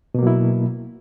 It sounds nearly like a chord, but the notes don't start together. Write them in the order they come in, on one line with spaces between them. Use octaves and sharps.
B2 A#3 F#3 E4